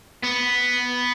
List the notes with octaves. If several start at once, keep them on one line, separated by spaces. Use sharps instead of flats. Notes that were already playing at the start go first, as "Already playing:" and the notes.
B3